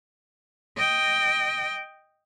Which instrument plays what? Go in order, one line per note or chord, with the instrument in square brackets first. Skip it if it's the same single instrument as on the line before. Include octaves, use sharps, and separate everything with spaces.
[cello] D#5 G5